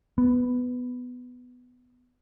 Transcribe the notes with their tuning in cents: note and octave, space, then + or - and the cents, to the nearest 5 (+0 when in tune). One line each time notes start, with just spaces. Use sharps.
B3 +10